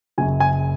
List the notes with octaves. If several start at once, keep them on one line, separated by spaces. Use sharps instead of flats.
F#1 F#2 C#3 F#3 G#5
G#5